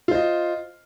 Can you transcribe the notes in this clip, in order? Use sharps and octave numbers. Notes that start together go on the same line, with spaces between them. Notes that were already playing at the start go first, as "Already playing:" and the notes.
F4 C5 D#5